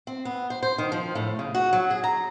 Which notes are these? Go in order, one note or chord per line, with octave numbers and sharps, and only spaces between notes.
C4
B3
C5
C5
D#3
F3
A2
C#3
F#4
F#3
G#4
A#5